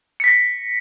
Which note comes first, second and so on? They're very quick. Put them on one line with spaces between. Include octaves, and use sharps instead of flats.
C#7 B6 A#6